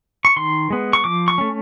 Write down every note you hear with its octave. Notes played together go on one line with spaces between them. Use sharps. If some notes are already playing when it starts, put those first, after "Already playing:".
C#6
D#3 C6
G#3 B3
C#6
F3 D6
C#6
A3 C#4